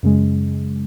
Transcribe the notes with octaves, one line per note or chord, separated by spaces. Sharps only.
F#2 C#3 G#3